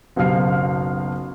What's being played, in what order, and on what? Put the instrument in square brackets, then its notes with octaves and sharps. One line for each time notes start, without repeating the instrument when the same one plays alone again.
[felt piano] F#1 B1 G4 F5 F6 C7